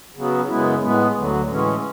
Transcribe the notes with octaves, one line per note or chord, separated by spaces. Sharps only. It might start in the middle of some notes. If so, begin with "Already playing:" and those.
C#3 F#3 B3
F#2 C#3 G#3 B3 E4
A2 G#3 B3
D2 D3 F#3
A2 E3 G#3 C#4